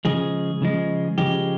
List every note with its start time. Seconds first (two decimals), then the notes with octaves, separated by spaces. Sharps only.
0.05 C#3 F3 G#3 G#4
0.62 C#3 F3 G#3
1.18 C#3 F3 G#3 G4